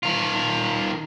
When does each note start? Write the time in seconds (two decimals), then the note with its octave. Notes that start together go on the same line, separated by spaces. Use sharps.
0.03 D#3 F4